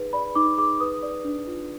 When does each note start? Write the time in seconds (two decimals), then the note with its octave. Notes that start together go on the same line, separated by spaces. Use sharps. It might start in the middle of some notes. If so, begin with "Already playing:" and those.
Already playing: D#4 G#4 B4
0.13 D5 B5
0.35 D#4 D6
0.58 G#4 D6
0.81 B4 D#6
1.03 D5
1.25 D4
1.47 F4